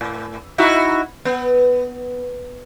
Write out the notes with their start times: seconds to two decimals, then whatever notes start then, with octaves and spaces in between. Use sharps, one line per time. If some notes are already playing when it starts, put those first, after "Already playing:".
0.01 A2
0.58 D#4 E4 F#4
1.25 B3